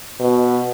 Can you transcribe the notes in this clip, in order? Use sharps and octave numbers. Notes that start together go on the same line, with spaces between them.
B2